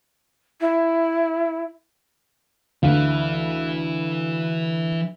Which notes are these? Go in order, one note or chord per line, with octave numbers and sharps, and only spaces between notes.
E4
D2 E3 F5